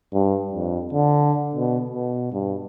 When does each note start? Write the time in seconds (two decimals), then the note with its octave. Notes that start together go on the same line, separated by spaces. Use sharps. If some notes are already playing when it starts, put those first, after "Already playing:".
0.13 G2
0.53 F2
0.93 D3
1.55 B2
1.90 B2
2.33 G2